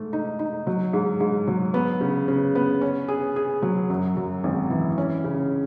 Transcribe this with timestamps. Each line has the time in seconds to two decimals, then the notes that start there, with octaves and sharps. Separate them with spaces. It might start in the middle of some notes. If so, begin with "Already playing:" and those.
Already playing: G#2 A3
0.13 D#4
0.39 D#4
0.67 F#3
0.93 G#2
1.20 G#2
1.47 F#3
1.74 B3
2.01 C#3
2.28 C#3
2.55 B3
2.81 C#4
3.08 G#4
3.36 G#4
3.62 F#3
3.90 F#2
4.17 F#2
4.44 G#1
4.70 E3
4.98 C#4
5.24 C#3